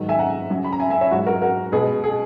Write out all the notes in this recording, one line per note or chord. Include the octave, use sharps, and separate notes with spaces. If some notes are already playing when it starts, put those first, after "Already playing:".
Already playing: G#2 D#3 F#3
E5 G#5
F#5 A#5
F#2 C#3 F#3
B5
A#5
E5 G#5
E5 G#5
C#5 E5
G#2 F#3 F#4
F#4 A#4
F#4 A#4
B2 G#3 G#4 B4
G#4